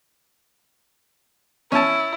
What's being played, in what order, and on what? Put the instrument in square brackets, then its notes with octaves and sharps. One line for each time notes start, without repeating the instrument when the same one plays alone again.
[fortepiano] C#4 A5 [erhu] E4